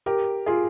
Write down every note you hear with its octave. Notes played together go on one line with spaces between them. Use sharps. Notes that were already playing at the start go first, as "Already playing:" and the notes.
G4 A#4
F4 G#4